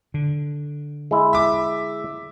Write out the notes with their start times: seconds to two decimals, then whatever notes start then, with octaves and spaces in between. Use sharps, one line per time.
0.14 D3
1.11 G#3 E4
1.33 E5 D6